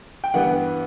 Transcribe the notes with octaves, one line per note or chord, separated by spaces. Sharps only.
G5
G2 E3 G3 B3 F#5